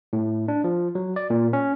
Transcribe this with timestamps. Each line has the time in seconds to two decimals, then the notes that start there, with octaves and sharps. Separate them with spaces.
0.13 A2
0.48 D4
0.64 F3
0.95 F#3
1.16 D5
1.30 A#2
1.53 C#4